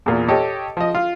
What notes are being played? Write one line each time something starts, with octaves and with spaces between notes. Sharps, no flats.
E2 A#2
G4 A4 C#5 D#5
F3 D#5
F4